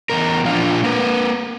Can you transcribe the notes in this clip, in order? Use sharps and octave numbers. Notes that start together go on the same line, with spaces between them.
E2 B2 A#4
A#2 F3 D4 F4 F5
A#3 A#4 B4